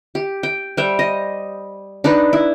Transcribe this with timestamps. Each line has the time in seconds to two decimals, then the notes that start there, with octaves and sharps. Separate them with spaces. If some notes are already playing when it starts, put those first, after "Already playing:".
0.15 G4
0.43 G5
0.77 G3 C5 E5 G5
0.99 D#5
2.04 D4 D#4 B4
2.33 E4